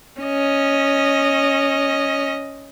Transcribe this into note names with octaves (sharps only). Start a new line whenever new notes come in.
C#4 D#5